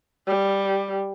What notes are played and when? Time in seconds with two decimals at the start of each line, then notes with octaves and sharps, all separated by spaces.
0.27 G3